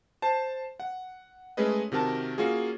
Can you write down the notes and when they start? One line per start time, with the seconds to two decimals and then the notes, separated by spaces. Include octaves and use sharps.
0.22 C5 A5
0.80 F#5
1.57 G#3 A3 C#4 G#4 B4 D#5
1.92 C3 D#3 F#4 A#4 A5
2.38 A#3 C#4 F4 F#4 G#4